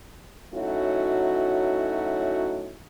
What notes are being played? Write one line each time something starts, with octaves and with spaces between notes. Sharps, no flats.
F#3 A3 C#4 D#4 E4 F#4